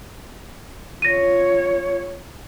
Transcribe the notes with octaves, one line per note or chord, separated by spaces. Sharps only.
F4 C#5 A#6 D#7